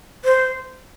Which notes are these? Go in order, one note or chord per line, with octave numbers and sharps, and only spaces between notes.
C5